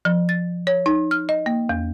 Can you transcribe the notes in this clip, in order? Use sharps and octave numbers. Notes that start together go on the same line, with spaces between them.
F3
A6
C#5
D#4
F6
D#5
A#3
E2